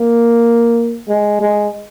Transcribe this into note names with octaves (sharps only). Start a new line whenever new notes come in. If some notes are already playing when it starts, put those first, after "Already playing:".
Already playing: A#3
G#3
G#3